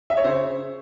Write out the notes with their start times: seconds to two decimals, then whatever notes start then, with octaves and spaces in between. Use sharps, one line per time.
0.10 E5
0.17 C#5
0.24 C#3 C5